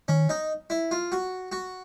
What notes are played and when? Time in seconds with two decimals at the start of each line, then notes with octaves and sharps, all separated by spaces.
0.08 D#3 C#4
0.29 D#4
0.70 E4
0.91 F4
1.12 F#4
1.52 F#4